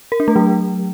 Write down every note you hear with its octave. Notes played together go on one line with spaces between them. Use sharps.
A#4
D4
A3
F#3